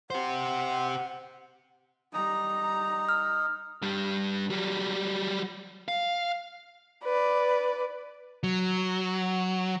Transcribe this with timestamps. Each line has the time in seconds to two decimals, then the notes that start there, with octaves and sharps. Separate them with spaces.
0.10 G4 C5 F#5
2.13 G3 D#4 A#5
3.09 F6
3.82 G2 G3
4.50 F#3 G3
5.88 F5
7.04 B4 D5
8.43 F#3